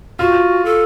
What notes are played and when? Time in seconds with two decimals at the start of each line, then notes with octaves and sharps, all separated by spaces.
0.19 F4 F#4
0.65 A4